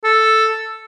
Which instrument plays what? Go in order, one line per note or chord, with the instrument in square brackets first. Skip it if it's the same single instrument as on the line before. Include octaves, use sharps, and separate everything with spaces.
[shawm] A4